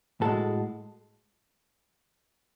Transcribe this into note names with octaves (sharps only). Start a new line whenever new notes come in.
A2 G#3 F#4 A4